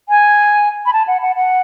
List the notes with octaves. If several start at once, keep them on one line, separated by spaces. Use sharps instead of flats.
G#5
B5
A5
F#5
F#5
F#5